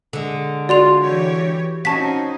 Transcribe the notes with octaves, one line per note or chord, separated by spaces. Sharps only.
D3 G#3
F4 F#4 D5 C6 F7
E3 G4 C#5
C4 C#4 D#4 F#4 A5 B6